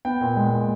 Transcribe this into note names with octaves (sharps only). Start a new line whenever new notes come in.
B3 G5
A#2
G#3
A#2